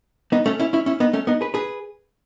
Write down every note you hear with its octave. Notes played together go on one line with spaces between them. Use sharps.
B3 D#4
A3 C#4
C#4 E4
C#4 E4
C#4 E4
B3 D#4
A3 C#4
B3 D#4
G#4 B4
G#4 B4